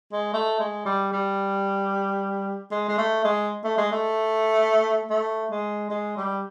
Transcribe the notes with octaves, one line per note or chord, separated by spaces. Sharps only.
G#3
A3
G#3
G3
G3
G#3
G#3
A3
G#3
A3
G#3
A3
A3
G#3
G#3
G3